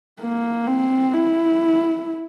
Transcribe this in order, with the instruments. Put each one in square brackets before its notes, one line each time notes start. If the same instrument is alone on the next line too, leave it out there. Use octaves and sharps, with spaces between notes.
[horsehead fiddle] A#3
C4
E4